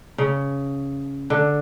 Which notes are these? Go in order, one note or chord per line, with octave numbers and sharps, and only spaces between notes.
C#3
D3